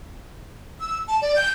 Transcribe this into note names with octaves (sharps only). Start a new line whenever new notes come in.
E6
A5
D5
G6